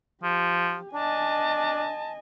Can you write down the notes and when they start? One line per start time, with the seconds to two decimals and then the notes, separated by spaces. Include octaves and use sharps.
0.23 F3 G4
0.94 D4 D#5 G#5 A5